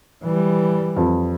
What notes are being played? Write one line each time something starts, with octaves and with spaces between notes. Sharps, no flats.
E3 G3
F2